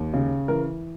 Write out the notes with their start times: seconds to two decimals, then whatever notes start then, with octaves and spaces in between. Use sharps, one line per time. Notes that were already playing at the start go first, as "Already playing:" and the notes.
Already playing: D#2
0.13 C#3
0.48 E3 A#4